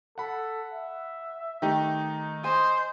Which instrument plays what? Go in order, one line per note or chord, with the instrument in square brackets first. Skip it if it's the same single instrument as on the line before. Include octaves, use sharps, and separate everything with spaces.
[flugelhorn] A4 [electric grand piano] F#5 B5
[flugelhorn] E5
[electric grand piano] D#3 A3 D#4 [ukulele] G4
[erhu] C5 [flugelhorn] D#5 [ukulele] G#5